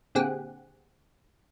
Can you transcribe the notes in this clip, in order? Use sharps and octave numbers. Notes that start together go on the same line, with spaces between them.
A#2 D3 C4 G4 G#4 F#5